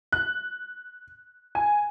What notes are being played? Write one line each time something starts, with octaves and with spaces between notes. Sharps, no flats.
F#6
G#5